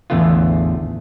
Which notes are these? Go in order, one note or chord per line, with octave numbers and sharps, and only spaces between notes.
A1 E2 D3 A3 B3 F4